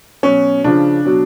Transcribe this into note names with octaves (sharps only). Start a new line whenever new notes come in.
B2 F#3 C#4
C#3 F3 D4
B2 F#3